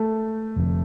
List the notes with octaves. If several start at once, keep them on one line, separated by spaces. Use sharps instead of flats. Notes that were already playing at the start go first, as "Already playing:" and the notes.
Already playing: A3
F1 F2 D3